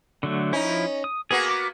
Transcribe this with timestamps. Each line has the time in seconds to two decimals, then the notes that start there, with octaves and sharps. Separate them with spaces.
0.23 D3 F#3 A3
0.53 F3 C#4 D#4 E4
1.04 D#6
1.31 A#3 B3 F#4 G#4
1.51 D6